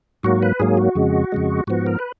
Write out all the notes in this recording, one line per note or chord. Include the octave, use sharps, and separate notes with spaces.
G#2 F#3 A#3 F#4
B4
G#2 F#3 A#3 G#4
F#4
F2 C#3 G#3
F2 C#3 G#3
G#2 F3 B3 F#4
A#4
B4